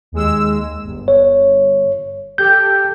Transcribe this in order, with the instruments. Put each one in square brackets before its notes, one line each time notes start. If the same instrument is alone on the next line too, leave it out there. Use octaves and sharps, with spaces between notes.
[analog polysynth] D#2 G#3 E6
G1
[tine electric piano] C#5
[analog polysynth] G4 A4 [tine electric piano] G6